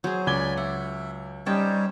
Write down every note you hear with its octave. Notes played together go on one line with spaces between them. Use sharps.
F#3 G#4 C5
C#2 D5 G#5 B5 G#6 G7
E5 F#5
G3 C#4 D#4 C5 C#5 G5 A5